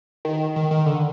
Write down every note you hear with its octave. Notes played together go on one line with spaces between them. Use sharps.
D#3
D#3
D#3
D3